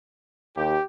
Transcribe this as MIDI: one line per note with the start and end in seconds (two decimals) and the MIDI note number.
0.56 0.77 39
0.56 0.84 67